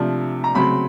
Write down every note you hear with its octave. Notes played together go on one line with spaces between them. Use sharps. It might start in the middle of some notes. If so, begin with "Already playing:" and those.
Already playing: C3 F3 A3 D4
A#5
C#3 F#3 A3 C4 B5